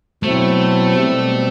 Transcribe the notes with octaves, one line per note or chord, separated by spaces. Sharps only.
B2 F#3 A3 C4 E4
B2 G3 C4